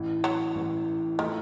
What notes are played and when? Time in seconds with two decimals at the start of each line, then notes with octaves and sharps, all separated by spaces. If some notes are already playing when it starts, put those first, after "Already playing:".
Already playing: A1 A2 E3
0.24 F#3
0.55 A1 A2 E3
1.19 A2 D#3 F3 A3